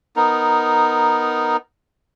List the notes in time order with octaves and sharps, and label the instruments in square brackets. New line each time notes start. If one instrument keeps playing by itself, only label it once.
[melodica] B3 D#4 A#4